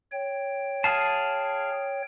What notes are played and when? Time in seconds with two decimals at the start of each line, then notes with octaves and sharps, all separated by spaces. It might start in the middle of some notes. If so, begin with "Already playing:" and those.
0.12 C#5 G5
0.84 G#4 F5 A5